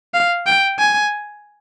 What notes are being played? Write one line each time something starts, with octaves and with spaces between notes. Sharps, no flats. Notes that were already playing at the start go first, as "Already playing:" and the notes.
F5
G5
G#5